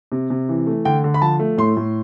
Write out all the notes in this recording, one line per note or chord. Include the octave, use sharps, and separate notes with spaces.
C3
C3
E3
A3
D3 G5
D3
B5
F3 A5
A3
A2 C6
A2